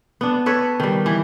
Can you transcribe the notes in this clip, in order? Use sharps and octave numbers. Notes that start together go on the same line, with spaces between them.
B3 D4
A4 B4 C#5
D#3 G3
E3